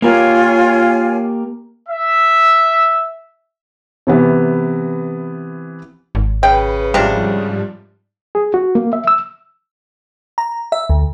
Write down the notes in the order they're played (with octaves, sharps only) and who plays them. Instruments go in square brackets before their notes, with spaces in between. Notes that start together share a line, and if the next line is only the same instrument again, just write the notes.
[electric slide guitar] A#3 G4 A#4 [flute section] F4 C#5 G#5
[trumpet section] E5
[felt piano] C3 E3 B3
[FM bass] G#1
[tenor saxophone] C#3 [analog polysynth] B4 [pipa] G5
[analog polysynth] G#2 F3 G3 [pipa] C3 A#3 D4
[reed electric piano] G#4
F#4
A#3
E5
E6
[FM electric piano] A#5
E5
D2